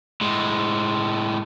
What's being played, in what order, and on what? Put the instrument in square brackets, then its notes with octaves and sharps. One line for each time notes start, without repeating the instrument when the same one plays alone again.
[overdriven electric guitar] A2 G#3